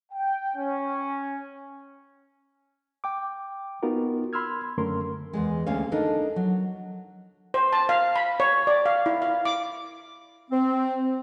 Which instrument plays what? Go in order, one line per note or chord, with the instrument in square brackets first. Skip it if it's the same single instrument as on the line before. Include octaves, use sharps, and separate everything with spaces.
[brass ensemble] G5
C#4
[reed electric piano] G5 D6
B3 D#4 F4 F#4 A#4
B5 C6 E6 F6 G#6
F#2 D3 A3 C#4 A#4 C6
[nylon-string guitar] E2 G#2 G#3
D2 A#3 C#4 G#4 C#5 F5
D4 D#4 A4 A#4 D#5
F#3
[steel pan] C5
A5
F5
B5
C#5
D5
F5
E4
F5
D6
[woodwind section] C4